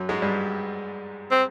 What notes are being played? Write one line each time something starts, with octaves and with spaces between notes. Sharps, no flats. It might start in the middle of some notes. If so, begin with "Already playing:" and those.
Already playing: F#2 F#3
G#2 G#3
G2 G3
C4